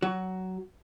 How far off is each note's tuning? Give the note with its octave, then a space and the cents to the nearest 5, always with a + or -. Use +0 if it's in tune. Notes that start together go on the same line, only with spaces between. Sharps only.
F#3 +15 F#4 +15